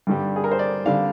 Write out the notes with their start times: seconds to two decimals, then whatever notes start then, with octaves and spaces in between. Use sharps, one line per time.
0.07 G2 D3 G3
0.36 G#4
0.44 A#4
0.51 C5
0.59 D5
0.86 D3 G3 F5